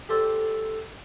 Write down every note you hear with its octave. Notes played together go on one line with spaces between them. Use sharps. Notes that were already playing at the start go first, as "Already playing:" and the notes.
G4 A4 C5 D5